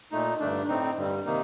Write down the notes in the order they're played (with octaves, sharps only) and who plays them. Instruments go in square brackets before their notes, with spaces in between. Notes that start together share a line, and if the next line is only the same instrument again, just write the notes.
[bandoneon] A#2 A3 D#4
G2 D3 A3 D4
A2 A3 C4 D#4
G2 D3 G3
C3 D#3 A#3 D#4